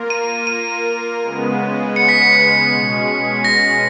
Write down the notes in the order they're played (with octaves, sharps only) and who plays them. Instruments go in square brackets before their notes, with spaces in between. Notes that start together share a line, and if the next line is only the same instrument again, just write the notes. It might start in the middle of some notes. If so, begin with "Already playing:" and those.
Already playing: [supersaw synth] A#3 F4 A#4
[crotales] D#7
D#7
[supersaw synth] C#3 G#3 B3
[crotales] C#7
B6
C#7
[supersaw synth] B2 G#3 C#4 G#4
[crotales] A#6